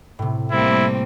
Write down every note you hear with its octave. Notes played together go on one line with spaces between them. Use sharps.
A2 C3
G3 A3 A#3 C4 E4